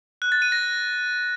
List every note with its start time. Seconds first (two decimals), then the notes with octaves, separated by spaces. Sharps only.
0.22 F#6
0.32 A6
0.42 D#7
0.52 A#6